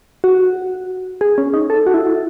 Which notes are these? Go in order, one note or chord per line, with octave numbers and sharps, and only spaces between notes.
F#4
G#4
C#4
D#4
A4
F#4
E4